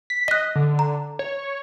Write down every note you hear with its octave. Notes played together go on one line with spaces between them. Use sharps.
B6
D#5 F#6 B6
D3
A#5
C#5